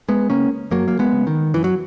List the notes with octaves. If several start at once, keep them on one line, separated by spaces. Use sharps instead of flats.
G#3 B3
C#3 A#3 C#4
F#2 F#3 A#3
A#3
G#3 B3
C#3
D#3
F#2 E3
F#3